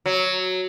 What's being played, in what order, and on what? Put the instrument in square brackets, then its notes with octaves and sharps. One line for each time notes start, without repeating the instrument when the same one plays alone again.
[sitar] F#3